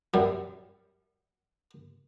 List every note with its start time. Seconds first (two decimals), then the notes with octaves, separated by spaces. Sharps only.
0.14 F#2 G3